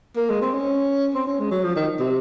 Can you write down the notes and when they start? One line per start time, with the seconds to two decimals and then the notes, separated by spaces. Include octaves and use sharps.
0.17 A#3
0.29 G#3
0.41 C4
0.54 C#4
1.14 C4
1.27 C#4
1.39 G#3
1.51 F#3
1.63 F3
1.76 D#3
2.00 C3